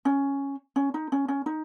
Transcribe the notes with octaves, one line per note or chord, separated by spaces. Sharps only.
C#4
C#4
D#4
C#4
C#4
D#4